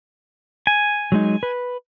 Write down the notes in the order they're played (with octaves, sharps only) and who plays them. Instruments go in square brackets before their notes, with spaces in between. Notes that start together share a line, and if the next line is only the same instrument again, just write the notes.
[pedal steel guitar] G#5
[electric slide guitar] F#3 G#3 D#4
B4